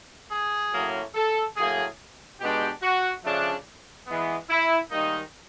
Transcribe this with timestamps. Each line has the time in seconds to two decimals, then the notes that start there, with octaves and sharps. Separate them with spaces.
0.31 G#4
0.73 A2 F#3 A#3 C#4
1.15 A4
1.57 A2 F#3 A#3 G#4
2.40 B2 G#3 B3 D4 G4
2.82 F#4
3.24 C#3 F3 A3 D4
4.07 E3 G#3 B3
4.50 E4
4.91 G#2 D#3 G3 A#3 D#4